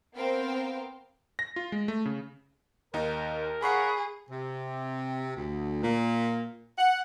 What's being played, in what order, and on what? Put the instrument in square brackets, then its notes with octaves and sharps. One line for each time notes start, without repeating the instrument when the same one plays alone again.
[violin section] B3 C4 A#4 C5 F5 G5
[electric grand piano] A#6
F4
G#3
A3
C#3
[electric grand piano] D#2 D#4 [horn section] A#4
[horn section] C#3 A#4 F#5 [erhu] G#4 [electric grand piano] B5 C#6 C7
[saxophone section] C3
D2
A#2
F#5